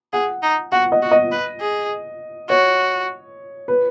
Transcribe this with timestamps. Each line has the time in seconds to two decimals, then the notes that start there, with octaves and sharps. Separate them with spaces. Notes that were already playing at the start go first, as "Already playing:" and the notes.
0.13 G#4 F#5
0.43 D#4
0.72 F#4 F#5
0.92 D#5
1.02 F#4
1.11 D#5
1.32 B4
1.61 G#4
2.49 F#4 C#5
3.68 B4